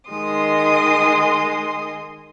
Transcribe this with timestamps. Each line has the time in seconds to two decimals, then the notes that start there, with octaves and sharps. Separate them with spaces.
0.10 D#3 G#3 C6 D#6